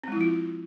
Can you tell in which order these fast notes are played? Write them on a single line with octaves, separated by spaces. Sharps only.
C4 G#3 E4 F3 F4